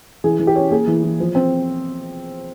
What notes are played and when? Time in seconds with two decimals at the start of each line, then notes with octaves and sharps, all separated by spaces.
0.24 E3 G#4
0.40 E3
0.47 G4
0.56 C#4
0.71 A#3 G#4
0.87 E3
1.04 E3
1.20 F3
1.35 C4